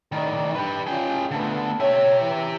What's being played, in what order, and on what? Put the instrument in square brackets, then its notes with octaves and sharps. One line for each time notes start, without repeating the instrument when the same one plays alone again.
[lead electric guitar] A2 D#3 [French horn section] D#4 D5
[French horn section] G2 [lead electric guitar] G4 B4
[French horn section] G#3 C#4 F4 [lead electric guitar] G#4 G5
[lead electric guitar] D3 A3 [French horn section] B3
[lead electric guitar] G4 E5 [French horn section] C#5
[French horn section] E3 E4